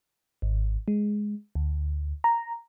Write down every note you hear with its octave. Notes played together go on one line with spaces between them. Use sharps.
G#1
G#3
D2
A#5